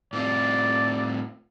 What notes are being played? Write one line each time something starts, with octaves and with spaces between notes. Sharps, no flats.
A2 C4 F4 D5